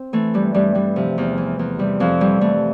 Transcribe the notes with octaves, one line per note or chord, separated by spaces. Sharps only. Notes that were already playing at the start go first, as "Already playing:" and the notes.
Already playing: C4
E3 A3
G2 G3
G2 G3
E3 G3
C3 F3
E2
E3
E2
C3 G3
F2 F3
E3 G3
F2 A3